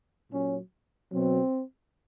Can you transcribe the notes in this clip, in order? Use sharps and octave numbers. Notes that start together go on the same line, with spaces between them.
A#2 F#3 C#4
B2 F#3 C4